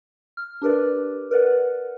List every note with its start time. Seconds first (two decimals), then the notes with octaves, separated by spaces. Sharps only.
0.37 F6
0.62 D4 G4 A#4 B4 D5
1.31 A#4 B4 D5 F#5